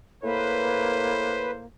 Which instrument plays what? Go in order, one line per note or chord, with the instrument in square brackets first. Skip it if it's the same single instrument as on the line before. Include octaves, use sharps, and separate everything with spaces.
[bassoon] A2 [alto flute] A#3 [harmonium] B4 [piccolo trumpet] C5